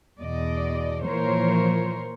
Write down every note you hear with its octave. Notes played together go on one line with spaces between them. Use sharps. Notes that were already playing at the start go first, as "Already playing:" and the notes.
E2 B2 D5 D#5
A#2 E3 F3 A#4 C5 C#5